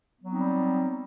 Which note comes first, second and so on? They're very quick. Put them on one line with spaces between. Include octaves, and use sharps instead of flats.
B3 F#3 C4 D#4 G3